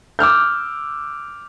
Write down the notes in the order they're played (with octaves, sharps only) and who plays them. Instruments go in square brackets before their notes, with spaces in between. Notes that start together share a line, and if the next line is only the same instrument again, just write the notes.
[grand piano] D6 E6 F6 G6